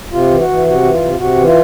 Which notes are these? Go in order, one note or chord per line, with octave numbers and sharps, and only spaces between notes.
C3 F4
E3
F#4
E3
C3 F#4
E3
F4
C3
C3 F#4
E3
F4